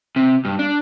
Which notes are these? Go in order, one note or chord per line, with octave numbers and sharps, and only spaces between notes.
C3
G2
D4